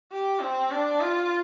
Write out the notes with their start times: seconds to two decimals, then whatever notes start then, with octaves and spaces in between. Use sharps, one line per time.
0.12 G4
0.42 C4
0.71 D4
1.01 F4